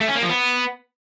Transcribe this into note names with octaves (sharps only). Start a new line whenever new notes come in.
A3
C#4
A#3
F3
B3